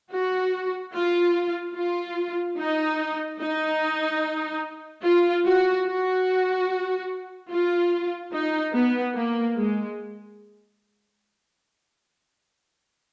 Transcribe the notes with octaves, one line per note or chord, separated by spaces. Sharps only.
F#4
F4
F4
D#4
D#4
F4
F#4
F#4
F4
D#4
B3
A#3
G#3